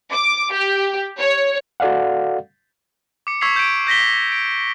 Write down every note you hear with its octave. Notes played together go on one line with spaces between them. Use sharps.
D6
G4
C#5
F#4 A4 D5 F5 F#5
D6 C#7
C#6 E6 G#6 B6 C7 F7
G6 D7
G6 A#6 B6 G7
D7